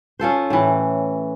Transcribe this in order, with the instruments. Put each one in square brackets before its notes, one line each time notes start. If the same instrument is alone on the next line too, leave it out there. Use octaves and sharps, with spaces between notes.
[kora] C#4 F4 A4 C5
A2 E3